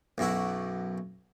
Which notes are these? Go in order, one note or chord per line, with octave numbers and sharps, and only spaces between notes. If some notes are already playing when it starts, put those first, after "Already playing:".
B1 F#2 E4 F#4